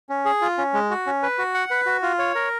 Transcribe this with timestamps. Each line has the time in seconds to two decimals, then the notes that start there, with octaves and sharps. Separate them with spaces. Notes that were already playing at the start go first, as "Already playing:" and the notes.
0.09 C#4
0.25 G#4
0.41 F4
0.58 C#4
0.74 G#3
0.90 F#4
1.07 C#4
1.23 B4
1.38 F#4
1.54 F#5
1.71 B4
1.86 F#4
2.02 F4
2.19 C#5
2.35 A#4